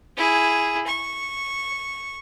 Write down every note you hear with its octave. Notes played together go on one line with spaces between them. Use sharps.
E4 G#4
C#6